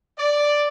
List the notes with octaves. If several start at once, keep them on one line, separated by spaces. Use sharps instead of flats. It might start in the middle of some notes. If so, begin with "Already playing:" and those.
D5